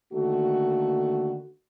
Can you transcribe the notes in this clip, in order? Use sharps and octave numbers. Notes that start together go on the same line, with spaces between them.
D3 D#3 A3 A#3 F#4